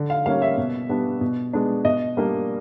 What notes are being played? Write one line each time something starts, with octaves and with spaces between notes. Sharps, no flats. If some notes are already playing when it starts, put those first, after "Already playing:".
Already playing: D3
F5
G3 A#3 C#4 F5
E5
B2
G3 B3 D4
B2
G#3 B3 D4
B2 D#5
G3 A#3 D4